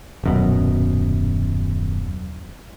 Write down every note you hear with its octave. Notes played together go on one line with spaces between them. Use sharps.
D#1 F#2 B2